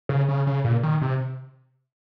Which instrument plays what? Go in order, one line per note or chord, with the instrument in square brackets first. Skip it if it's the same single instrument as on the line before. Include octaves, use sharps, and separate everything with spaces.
[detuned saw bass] C#3
C#3
C#3
A#2
D#3
C3